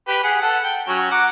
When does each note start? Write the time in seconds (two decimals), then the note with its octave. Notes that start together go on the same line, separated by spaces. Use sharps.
0.08 G4 B4
0.23 G#4 F#5
0.42 A4 F#5
0.64 G5
0.88 F#3 C#4 F#4
1.11 F#5 A#5 D6